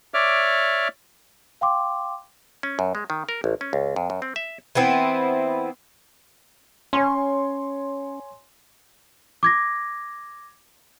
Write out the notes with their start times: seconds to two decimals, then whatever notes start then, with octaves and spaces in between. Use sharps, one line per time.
0.14 C#5 D5 E5 D6 F6
1.61 F5 G5 C6 D6
2.63 C#4
2.79 F#2
2.95 G#3
3.10 D#3
3.29 A#4
3.44 A1
3.61 C#4
3.73 C#2
3.96 F2
4.10 F#2
4.22 C4
4.36 E5
4.75 E3 B3 C4 E4
6.93 C#4 C#5 G#5 C6
9.43 D6 G#6 A#6